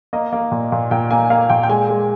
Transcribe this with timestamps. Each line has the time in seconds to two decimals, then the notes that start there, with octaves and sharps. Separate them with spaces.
0.13 A#3 D#5
0.33 A#3
0.52 A#2
0.72 A#2
0.91 A#2 G5
1.11 A#3 G#5
1.30 A#3 F5
1.50 A#2 G5
1.63 G5
1.69 G#3 G#5
1.89 G#3